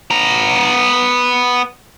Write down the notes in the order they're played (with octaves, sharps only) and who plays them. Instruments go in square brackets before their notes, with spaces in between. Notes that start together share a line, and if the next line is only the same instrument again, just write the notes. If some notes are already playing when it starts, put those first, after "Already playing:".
[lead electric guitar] B3 A#5